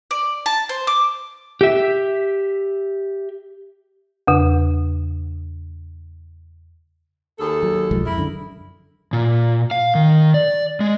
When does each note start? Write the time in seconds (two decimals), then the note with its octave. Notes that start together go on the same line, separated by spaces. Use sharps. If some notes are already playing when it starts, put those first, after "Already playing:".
0.11 D5
0.46 A5
0.69 C5
0.87 D6
1.61 G4 E5
4.27 E2 C#3
7.39 D#2 G#4 A4
7.63 F#3
7.91 B1 F3 G#3
8.05 F2 E4 A#4
8.18 F#2 D3
9.13 A#2
9.71 F5
9.95 D#3
10.34 D5
10.81 G#3